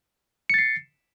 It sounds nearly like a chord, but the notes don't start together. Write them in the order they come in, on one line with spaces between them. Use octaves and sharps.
C#7 A6 C7